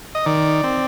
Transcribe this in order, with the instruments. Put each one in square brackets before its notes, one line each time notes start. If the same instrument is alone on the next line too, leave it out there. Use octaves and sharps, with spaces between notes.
[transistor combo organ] D#5
D#3 D5
C4